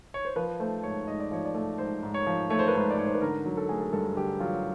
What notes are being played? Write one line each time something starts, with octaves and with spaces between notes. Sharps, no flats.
C#5
C5
F3 B4
A3 C5
G#2 C#5
G#2 D#5
D5
F3 C#5
D5
A3
G#2 C5
G#2
C#5
F3
A3 C#5
C5
B4
G#2 C5
D5
G#2 C#5
C5
B4
D3 A#4
F#3
A4
A3 G#4
A4
G2 A4
D3 G4
F#3 F4